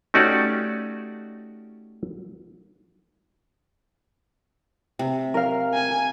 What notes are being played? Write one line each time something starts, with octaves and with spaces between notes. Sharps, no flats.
A3 C#4 D#4 F#4 G4 D5
C3
A#4 F5
G#5